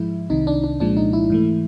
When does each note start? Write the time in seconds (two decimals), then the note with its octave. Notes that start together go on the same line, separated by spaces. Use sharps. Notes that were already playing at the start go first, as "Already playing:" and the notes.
Already playing: G#2 F3 G#3 E4
0.30 C2 C3 D#3 D#4
0.47 D4
0.64 D4
0.80 C2 A#2 F3 G#3 D4
0.97 D#4
1.13 E4
1.30 G#2 E3 A3